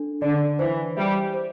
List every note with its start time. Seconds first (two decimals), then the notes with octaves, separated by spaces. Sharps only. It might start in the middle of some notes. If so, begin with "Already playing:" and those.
Already playing: D4 A4
0.22 D3 D5
0.59 E3 C5
0.97 G3 E5
1.34 C5